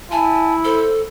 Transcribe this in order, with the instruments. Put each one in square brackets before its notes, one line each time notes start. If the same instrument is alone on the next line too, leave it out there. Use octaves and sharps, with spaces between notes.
[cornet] E4 [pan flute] G#5 [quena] A5
[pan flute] A4 [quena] C5